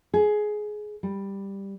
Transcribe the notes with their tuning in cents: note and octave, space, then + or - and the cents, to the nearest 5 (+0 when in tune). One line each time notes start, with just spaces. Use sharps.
G#4 +15
G3 +5